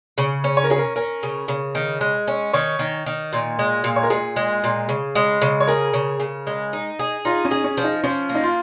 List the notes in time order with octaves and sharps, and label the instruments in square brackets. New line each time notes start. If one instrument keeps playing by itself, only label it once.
[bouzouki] C#3
C#4
[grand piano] C#5
A#4
[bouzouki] C#4 [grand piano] G#4
[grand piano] A#4
[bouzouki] C#4 [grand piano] A#4
[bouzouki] C#3
C#3
D#3
G#3
C#4
[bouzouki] D#3 [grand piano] C#5
[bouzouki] D#3
D#3
A#2
G#3
A#2
[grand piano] C#5
A#4
[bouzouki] A#2 [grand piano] G#4
[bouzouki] G#3
A#2
C#3
G#3
C#3
[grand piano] C#5
[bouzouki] G#4 [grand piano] A#4
[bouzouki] C#3
C#3
G#3
D#4
G#4
[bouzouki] D#4 [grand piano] F4
[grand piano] C#4
[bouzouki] G#4
[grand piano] C#4
[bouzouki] F3
[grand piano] D#4
[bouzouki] F3 [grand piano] C#4
[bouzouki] A#3
[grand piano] D#4
F4